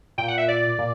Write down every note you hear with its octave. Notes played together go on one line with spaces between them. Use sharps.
A#2 G5
F#5
E5
D5
A#2